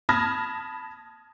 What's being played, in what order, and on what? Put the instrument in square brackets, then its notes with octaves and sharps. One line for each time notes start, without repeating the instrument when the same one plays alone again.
[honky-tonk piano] A5 B5 D#6 F6 G#6 A#6